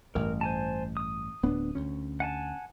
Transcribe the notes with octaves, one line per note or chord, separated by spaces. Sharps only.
A1 G2 A#4
C5 G#5 A5
D#6
D1 B3 D4
D2 C#4
F#5 G#5 A5